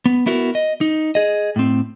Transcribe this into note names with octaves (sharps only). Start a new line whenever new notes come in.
B3
B3 E4 F#4 A#4
D#5
D#4
G#4 D#5
A2 C4